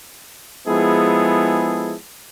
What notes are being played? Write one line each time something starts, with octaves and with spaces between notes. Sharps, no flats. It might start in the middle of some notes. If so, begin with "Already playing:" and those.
F3 G#3 B3 E4 G#4 A4